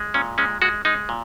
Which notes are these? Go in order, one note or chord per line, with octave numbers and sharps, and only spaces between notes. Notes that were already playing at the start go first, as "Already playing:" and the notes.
Already playing: G#3
A#2 C#4
G#3 C#4
G#3 F#4
G#3 D#4
A#2